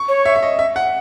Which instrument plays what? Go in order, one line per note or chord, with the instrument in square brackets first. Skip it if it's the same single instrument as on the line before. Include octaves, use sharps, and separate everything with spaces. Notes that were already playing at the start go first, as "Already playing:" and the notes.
Already playing: [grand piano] C#6
[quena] C#5
[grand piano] E5
E5
D#5
E5
F#5